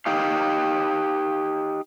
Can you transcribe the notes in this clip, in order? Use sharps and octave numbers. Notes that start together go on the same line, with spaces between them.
D#4 G4 F5